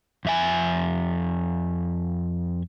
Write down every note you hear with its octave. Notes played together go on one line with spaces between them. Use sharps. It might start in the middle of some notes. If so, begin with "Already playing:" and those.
F2 E5 G#5